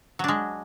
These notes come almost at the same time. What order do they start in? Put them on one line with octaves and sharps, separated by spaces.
F#3 D4 G#3